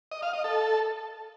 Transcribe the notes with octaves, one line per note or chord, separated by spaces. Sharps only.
D#5
F5
D#5
A4